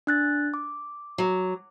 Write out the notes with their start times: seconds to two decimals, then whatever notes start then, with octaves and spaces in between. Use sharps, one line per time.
0.07 D4 F#6 A6
0.54 D6
1.18 F#3